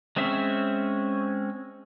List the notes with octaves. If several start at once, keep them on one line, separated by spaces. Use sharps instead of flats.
G#3 C4 C#4 E5 E6